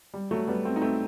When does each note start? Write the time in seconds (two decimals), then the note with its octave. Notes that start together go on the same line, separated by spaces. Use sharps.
0.14 G3
0.31 F#3 A3
0.48 G3 B3
0.65 A3 C4
0.76 D#4
0.81 A3 C4